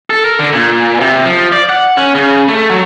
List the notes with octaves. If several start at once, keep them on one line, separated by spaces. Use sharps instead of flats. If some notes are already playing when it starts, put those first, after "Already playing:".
A4
A#4
D3
A#2
C3
F3
D5
F#5
C#4
C#3
A3
F#3